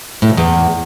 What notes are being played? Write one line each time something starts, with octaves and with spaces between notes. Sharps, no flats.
A2
F2
E2